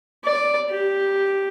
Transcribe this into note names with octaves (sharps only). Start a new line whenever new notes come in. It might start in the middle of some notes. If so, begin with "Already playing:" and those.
D5
G4